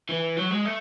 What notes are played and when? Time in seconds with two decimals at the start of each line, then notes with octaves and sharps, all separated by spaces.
0.09 E3
0.36 F#3
0.50 G#3
0.65 A3